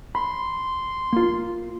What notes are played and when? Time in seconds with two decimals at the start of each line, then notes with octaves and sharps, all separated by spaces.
0.15 B5 C6
1.13 A#3 F4